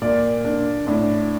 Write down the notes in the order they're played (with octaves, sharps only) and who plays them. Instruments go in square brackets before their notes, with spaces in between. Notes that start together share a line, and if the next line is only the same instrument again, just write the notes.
[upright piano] A#2 [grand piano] D5
[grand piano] D4
[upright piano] A2 [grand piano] D4